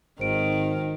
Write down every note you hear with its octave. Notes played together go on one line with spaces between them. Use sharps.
G#1 D#3 C5 D7